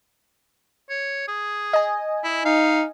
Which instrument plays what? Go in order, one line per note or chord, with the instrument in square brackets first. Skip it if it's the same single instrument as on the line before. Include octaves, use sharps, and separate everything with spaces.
[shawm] C#5
G#4
[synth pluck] D#5 G#5
[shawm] E4
[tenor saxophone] D#4 [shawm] F5